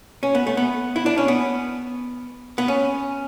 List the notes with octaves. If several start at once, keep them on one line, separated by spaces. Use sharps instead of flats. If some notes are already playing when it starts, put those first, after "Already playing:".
C#4
B3
A3
B3
E4
D4
C#4
B3
B3
C#4